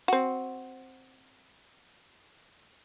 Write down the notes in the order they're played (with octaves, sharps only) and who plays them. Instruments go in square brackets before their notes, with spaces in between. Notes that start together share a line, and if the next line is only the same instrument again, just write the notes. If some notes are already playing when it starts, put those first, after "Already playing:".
[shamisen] C4 F#4